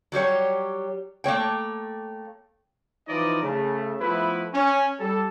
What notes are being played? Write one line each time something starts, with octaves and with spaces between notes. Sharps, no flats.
F#3 G3 G4 C#5
A3 A#3 C#5 G5
E3 F3 D#4 D5 D#5
C#3 A3
F3 A3 B3 E4 B4
C#4
G3 A4